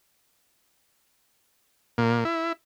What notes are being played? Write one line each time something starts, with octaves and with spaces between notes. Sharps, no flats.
A#2
E4